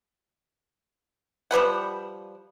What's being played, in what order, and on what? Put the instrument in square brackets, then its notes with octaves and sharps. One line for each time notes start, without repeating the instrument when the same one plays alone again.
[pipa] F3 G3 B4 F#5